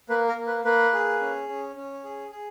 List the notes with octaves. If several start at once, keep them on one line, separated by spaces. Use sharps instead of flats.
A#3 B4
A#4
A#3
B4
A#3 B4
G#4
C#4
C#4
C#4
G#4
G#4